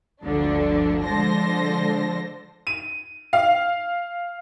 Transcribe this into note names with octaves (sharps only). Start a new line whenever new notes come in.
G1 D2 D3 F3 D4
D3 F3 G#3 C5 A5 A#6
D#7
F5